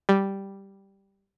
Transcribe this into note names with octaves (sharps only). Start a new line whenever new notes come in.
G3